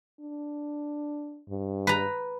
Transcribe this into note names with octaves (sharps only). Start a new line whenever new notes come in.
D4
G2
B4 A#5